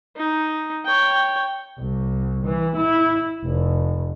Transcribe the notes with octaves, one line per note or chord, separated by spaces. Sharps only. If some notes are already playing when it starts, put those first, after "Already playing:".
D#4
C#5 G5
C2
E3
E4
F1